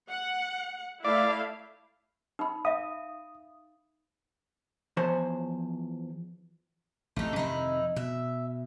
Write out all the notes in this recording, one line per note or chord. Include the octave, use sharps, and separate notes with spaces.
F#5
A3 E4 D5 F5
D#4 B5
E5 F5 D#6
E2 F3 C5 C#5
A1 E2 C3 A3 D#4
F2 C3 D#3 D#4 E4
B2 E5